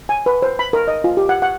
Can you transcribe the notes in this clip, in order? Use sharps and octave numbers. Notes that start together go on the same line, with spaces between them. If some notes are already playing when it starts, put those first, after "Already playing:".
G#5
B4
C5
B5
A#4
D#5
F4
G4
F#5
F#5